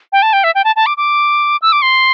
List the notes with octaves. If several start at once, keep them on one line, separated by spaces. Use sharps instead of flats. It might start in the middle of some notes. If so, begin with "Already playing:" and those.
G5
A5
G5
E5
G5
A5
A5
D6
D6
E6
D6
C6